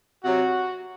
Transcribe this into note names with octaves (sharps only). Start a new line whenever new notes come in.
C3 F#3 F#4